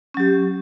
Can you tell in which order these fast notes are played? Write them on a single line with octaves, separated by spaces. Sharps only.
C#4 F#3 G4